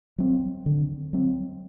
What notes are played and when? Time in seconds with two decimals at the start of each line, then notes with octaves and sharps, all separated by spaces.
0.18 F#3 C4
0.66 D3
1.13 F#3 C4